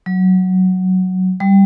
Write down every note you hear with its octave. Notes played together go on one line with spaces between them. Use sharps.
F#3
G3